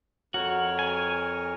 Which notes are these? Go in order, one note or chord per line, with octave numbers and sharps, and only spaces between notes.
F2 F#4 A#4 C#5
G#5